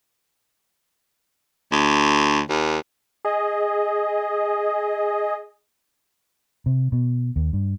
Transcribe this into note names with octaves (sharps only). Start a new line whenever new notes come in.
D2
D#2
G#4 D#5
C3
B2
D#2
G2